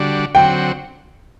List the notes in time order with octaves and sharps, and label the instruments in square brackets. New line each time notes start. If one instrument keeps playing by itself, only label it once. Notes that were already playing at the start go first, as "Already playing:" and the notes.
Already playing: [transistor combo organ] D3 G3 D4 F#4
[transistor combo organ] D3 F#3 C4 F#4 [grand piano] G5